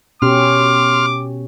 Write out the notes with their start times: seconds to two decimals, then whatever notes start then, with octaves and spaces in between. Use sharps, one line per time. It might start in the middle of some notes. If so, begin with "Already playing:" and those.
0.22 B2 C#4 G4 C6 D6 F6